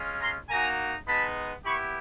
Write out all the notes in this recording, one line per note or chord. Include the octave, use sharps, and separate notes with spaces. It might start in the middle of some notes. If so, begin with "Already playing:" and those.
Already playing: G#3 C#4 F4
A#5 C6
A#3 D#4 F#4 G#5 A#5
G#3 B3 D#4 A5 B5
B3 E4 G4 B5 C#6